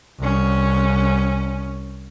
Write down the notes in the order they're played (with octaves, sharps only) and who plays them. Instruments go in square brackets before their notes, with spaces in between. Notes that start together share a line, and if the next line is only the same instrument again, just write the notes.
[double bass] C2 C#4